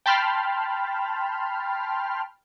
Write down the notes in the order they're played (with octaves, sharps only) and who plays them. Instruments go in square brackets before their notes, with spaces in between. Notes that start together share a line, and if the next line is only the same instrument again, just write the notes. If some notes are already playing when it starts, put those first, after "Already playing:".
[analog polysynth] G5 A5 B5 C6 F6